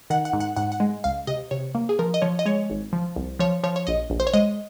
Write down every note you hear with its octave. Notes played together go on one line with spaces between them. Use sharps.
D#3 F#5
F#5
G#2
F#5
G#2 F#5
F#5
G#3
C#2 F5
C3 D#5
C3 C#5
A#3
G#4
F3 A#4
D#5
F3 C#5
D#5
G#3 C#5
G#1
F3
C2
F3 C#5
F3 C#5
C#5
A#1 D#5
A#1
C5
C#5
G#3 D#5